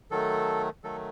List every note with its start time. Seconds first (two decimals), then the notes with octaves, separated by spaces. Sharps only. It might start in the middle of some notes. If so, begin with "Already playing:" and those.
0.11 D#3 F#3 A3 A4
0.84 D#3 F#3 A3 A4